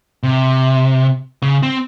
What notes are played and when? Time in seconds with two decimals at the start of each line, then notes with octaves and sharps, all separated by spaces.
0.23 C3
1.42 C#3
1.63 C4